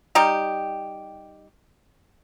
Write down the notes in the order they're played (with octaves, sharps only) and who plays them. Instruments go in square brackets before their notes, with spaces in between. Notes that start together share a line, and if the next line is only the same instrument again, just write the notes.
[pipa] G3 D#4 G4